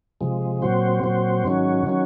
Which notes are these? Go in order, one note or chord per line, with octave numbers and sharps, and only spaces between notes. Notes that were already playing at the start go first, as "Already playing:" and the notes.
C3 F3 G#3
A#2 F#3 C4 F#4 C5
A#2 F#3 C4 F#4 C5
G#2 D#3 F#3 C#4 F#4
D#3 F#3 C#4 F#4